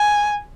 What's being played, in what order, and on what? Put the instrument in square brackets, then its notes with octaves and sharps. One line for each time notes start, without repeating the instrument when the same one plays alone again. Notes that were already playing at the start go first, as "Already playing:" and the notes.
Already playing: [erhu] G#5